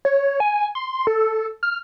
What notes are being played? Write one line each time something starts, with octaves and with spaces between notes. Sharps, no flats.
C#5
G#5
C6
A4
F6